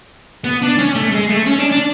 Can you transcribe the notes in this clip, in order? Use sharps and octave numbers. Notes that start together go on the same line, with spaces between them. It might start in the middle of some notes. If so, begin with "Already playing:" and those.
B3
D4
C#4
A3
G#3
A3
C#4
D4
D4